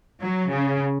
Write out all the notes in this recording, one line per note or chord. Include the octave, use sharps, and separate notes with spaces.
F#3
C#3